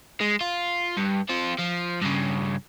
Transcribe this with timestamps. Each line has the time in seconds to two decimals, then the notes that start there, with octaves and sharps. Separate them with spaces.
0.21 G#3
0.41 F4
0.97 G2
1.29 C4 F4
1.58 F3
2.01 G2 C#3